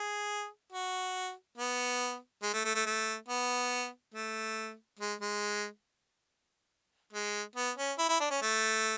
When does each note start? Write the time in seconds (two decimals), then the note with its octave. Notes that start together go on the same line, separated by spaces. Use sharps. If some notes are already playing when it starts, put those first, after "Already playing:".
Already playing: G#4
0.72 F#4
1.58 B3
2.43 G#3
2.54 A3
2.65 A3
2.75 A3
2.86 A3
3.28 B3
4.14 A3
4.99 G#3
5.21 G#3
7.13 G#3
7.56 B3
7.77 C#4
7.99 E4
8.09 E4
8.20 D4
8.31 C#4
8.42 A3